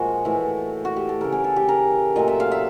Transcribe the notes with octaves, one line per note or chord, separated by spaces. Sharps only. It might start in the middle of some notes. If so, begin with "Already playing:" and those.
Already playing: A#2 F3 G#3 F#4
A2 E3 A3
F#4
G4
A4
C#3 E3 A3 A#4
G#4
A4
G4
A#4
A#2 F#3 A3 D#5
E5
F5
E5